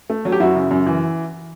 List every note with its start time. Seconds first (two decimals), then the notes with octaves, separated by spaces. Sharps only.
0.10 A3
0.25 F#3
0.32 G4
0.40 F#2 E4 F#4
0.55 C#3
0.71 F#2
0.87 E3